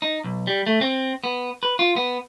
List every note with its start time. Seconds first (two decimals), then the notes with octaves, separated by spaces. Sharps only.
0.02 D#4
0.24 B1
0.47 G3
0.66 A3
0.81 C4
1.24 B3
1.63 B4
1.79 F4
1.96 B3